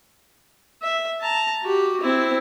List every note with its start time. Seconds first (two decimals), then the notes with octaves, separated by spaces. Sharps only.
0.82 E5
1.21 A5 A#5
1.63 F#4 G4
2.01 C4 E4